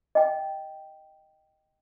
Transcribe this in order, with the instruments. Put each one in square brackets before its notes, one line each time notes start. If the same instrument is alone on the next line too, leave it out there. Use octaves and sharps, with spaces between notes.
[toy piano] D#5 G5